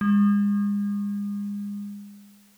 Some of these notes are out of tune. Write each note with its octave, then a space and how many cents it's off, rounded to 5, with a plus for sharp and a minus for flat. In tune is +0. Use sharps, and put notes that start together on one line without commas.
G#3 -35